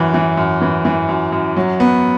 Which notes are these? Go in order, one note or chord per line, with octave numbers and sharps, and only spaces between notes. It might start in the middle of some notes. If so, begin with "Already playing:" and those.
Already playing: F#2 E3
E3
F#2
E3
E3
F#2
F#2
F#3
B3